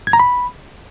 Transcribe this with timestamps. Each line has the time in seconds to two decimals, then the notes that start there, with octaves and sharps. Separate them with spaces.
0.07 G#6
0.13 A#5
0.20 B5